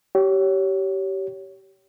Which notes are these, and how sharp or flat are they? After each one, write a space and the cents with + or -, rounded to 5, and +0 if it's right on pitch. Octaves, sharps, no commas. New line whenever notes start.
G4 -25 C#5 +15